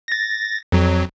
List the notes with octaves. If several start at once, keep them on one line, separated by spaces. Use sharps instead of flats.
A6 A#6
F2 F#3